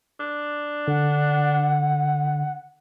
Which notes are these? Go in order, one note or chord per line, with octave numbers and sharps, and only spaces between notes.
D4
D3 F#5